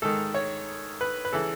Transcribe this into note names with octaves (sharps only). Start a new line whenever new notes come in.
G#2 D#3 A4
C#5
B4
B4
C#3 E3 A4